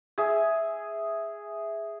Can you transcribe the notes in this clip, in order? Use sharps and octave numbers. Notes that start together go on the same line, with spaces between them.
G#4 E5